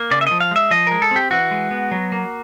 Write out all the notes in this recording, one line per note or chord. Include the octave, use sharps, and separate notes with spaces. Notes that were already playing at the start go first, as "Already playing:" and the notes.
Already playing: A#3
C#3 D5
E5
F3 D#5
F5
G#3 E5
F3 D#5
G#3 A#4
A4
C4 G4
E3 F#4
G#3
B3
F#3
A#3